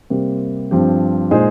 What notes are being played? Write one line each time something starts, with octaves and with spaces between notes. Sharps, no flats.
C3 G3 A#3
G2 F3 C4 G4
A#2 G#3 D#4 G#4 C5